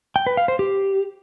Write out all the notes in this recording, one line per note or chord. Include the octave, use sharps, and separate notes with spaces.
G5
B4
F5
C5
G4